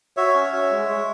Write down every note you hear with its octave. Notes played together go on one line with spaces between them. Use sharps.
F#4 C#5 E5
C#4
F#4
G#3
G#3